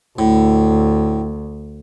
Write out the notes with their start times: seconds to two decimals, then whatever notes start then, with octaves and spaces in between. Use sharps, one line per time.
0.19 D2 A2